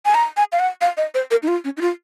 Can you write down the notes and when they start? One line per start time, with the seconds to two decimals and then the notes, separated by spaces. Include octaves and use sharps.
0.06 G#5
0.15 A#5
0.37 G#5
0.52 F5
0.59 F#5
0.81 F5
0.97 D#5
1.14 C5
1.31 A#4
1.43 D#4
1.48 F4
1.64 C#4
1.77 D#4
1.81 F4